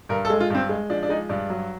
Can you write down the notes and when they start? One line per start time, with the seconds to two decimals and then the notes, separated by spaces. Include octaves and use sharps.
0.09 G2 A#4
0.25 A4
0.30 G#3
0.40 F4
0.50 G2 C4
0.69 G#3
0.90 F3 D4
1.03 D4
1.09 G#3 D#4
1.29 G2 D4
1.50 F#3